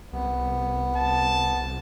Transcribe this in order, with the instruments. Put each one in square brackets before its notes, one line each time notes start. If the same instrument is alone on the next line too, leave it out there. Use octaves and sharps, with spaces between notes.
[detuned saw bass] C2 [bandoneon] B3
[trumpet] A5